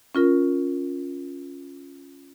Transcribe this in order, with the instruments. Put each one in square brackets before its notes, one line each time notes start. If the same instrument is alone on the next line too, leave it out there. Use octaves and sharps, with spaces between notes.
[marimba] C#4 F4 A#4